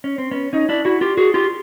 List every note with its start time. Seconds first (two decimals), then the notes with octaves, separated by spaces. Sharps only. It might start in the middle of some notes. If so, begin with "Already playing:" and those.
0.04 C#4
0.18 C4
0.31 B3 C#4
0.53 C#4 D#4
0.69 D4 E4
0.85 E4 F#4
1.01 F4 G4
1.17 F#4 G#4
1.34 F4 G4